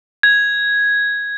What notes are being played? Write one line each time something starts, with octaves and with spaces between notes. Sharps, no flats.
G#6